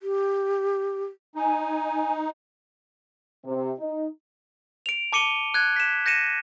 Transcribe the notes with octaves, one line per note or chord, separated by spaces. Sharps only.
G4
D#4 G#5
C3
D#4
D7 F7
A5 D6 C#7 D#7 G7
F#6 G#6
B6 E7
G6 A#6 C#7 D#7 E7